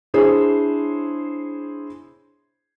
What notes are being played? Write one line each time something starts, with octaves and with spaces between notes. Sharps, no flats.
D4 E4 G#4 C5 C#5